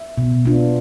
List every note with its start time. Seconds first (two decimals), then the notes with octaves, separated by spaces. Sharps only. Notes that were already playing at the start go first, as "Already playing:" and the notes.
Already playing: E5
0.18 B2
0.45 B3 D4 F4